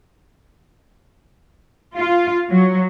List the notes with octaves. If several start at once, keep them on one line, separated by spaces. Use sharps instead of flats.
F4
F#3